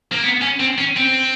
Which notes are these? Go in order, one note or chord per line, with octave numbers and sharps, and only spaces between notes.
A#3
B3
C#4
C4
C#4
C4